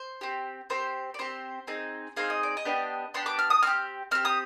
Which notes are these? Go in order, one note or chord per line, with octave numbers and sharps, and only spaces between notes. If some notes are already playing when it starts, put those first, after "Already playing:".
Already playing: C5
C4 G4
C4 G4 C5
D5
C4 G4 C5
C4 D#4 G#4
C4 D#4 G#4 F5
D#5
D5
D#5
B3 D4 G4
B3 D4 G4 C6
D6
F6
D#6
C4 G4 F6
C4 G4 F6
D#6